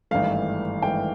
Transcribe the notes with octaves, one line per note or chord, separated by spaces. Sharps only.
G#1 G2 E3 A3 F5
G#1 G2 E3 A3 G5